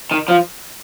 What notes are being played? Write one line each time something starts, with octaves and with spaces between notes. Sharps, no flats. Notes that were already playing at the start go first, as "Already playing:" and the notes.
D#3
F3